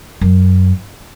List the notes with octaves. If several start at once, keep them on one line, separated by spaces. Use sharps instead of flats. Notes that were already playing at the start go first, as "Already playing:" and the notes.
F#2